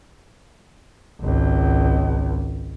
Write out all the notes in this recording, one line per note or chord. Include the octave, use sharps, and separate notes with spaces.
G#1 C#2